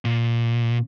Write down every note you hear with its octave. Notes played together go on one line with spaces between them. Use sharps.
A#2